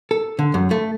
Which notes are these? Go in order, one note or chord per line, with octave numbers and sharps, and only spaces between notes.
A4
D3
F#2
A3